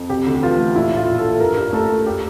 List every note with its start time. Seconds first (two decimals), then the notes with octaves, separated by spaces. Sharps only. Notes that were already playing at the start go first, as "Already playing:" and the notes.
Already playing: F2
0.09 C3 G4
0.26 D2
0.42 E3 F4
0.59 A3
0.76 A#1 E4
0.92 A2 F4
1.07 A#1
1.19 A4
1.24 A#1
1.40 G2 A#4
1.57 G2
1.73 A3 A4
1.89 G2
2.06 G4